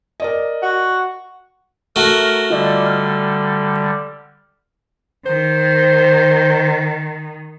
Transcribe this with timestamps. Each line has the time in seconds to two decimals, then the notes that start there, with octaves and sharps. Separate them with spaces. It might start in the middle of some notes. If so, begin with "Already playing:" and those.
0.20 A#4 D5 D#5
0.63 F#4
1.96 A3 F#4 A#4
2.50 D3 G3 F4 D5 D#5
2.86 F6
5.26 D#3 C5